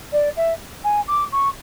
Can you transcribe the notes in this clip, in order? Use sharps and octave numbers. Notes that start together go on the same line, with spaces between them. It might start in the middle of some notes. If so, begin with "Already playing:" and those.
D5
E5
G#5
D6
C#6